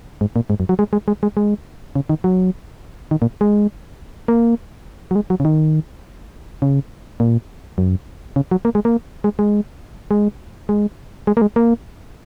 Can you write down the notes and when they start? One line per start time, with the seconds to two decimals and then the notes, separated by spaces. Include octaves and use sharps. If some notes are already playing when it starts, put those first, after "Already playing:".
0.21 G#2
0.36 A#2
0.50 G#2
0.60 F#2
0.69 F#3
0.79 G#3
0.93 G#3
1.08 G#3
1.23 G#3
1.37 G#3
1.96 C#3
2.09 D#3
2.24 F#3
3.11 D#3
3.22 A#2
3.41 G#3
4.28 A#3
5.11 F#3
5.15 G#3
5.30 F#3
5.40 C#3
5.45 D#3
6.62 C#3
7.20 A#2
7.78 F#2
8.36 C#3
8.51 F#3
8.65 A#3
8.75 G#3
8.85 A#3
9.24 G#3
9.39 G#3
10.11 G#3
10.69 G#3
11.27 G#3
11.37 A#3
11.42 G#3
11.56 A#3